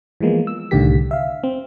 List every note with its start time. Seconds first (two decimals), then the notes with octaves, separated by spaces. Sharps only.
0.21 E3 F3 G#3 A#3 B3
0.47 E6
0.71 C2 A2 D3 D#3 G4 B6
1.11 E5 F5
1.44 C4